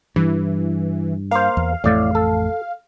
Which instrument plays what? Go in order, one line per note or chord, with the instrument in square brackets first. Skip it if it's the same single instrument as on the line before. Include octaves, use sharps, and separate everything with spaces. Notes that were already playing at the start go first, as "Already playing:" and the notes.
[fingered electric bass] G2 [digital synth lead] E3
[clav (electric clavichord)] A#3 C5 [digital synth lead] F5
[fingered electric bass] E2
[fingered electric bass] A1 F2 A3 [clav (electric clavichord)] A2 D5
[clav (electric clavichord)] A4